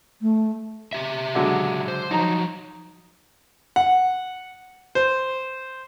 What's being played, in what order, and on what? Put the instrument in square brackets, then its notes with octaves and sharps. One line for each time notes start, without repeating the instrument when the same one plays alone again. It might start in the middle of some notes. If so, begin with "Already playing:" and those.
[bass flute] A3
[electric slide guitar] C#3 G4 E5
[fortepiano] D3 F#3 G#3
[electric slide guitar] C5
[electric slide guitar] F3 F#3 [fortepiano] D#4 A#5
[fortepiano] F#5
C5